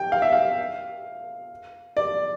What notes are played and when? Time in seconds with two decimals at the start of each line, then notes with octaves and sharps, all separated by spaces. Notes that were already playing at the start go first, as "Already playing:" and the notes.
Already playing: G5
0.12 F5
0.22 E5
0.33 F5
1.97 D5